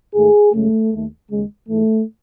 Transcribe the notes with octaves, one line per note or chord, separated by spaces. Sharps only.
G#2 D#3 A3 G#4
G#1 F#2 C#3 G#3 A3
D#2 D#3 A3
D#2 C#3 G#3
G#2 E3 G#3 A3